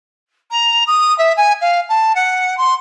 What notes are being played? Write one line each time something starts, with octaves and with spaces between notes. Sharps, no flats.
A#5
D#6
E5
G#5
F5
A5
F#5
C6